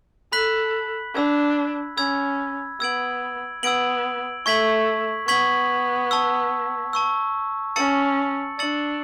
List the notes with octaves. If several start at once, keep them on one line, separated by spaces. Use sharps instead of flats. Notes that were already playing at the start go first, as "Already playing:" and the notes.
A4 B5 F#6 B6 F#7
D4 B5 E6 G#6
C#4 B5 E6 G#6
B3 E6 G#6 D7 F#7
B3 E6 G#6 D7 F#7
A3 C#6 G#6 B6 F#7
B3 C#6 G#6 B6 F#7
A5 C#6 E6
A5 C#6 E6
C#4 A5 E6 A6 C#7 F#7
D4 A5 E6 A6 C#7 F#7